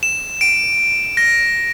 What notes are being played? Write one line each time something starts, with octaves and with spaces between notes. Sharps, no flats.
E7
D7
A#6